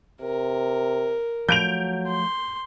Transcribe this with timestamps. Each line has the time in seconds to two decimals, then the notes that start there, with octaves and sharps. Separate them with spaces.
0.22 C3 A#4
1.49 F3 F#3 A3 G6 D7 F7
2.08 C6